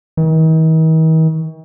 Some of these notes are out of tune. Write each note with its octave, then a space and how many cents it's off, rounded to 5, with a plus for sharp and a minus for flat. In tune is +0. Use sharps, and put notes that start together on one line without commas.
D#3 +45